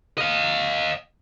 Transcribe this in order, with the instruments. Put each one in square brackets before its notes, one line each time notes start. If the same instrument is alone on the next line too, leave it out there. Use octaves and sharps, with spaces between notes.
[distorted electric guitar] D#5 F5